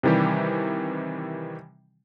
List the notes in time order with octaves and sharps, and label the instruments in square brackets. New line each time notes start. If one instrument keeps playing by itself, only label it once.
[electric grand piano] C3 D#3 E3 G3 G4